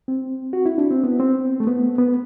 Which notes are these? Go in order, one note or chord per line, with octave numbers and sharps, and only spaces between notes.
C4
F#4
E4
D4
C4
B3
C4
A3
B3
B3